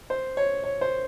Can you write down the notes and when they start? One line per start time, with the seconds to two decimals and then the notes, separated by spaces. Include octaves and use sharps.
0.10 C5
0.37 C#5
0.64 C#5
0.81 C5